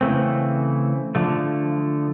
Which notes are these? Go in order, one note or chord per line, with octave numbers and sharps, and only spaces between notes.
C#3 E3 A3 C4
D3 F3 A3